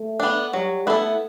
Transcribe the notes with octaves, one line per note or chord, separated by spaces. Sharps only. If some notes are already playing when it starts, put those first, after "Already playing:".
Already playing: A3
B3 D4
F#3 G3
A3 B3 E4 A4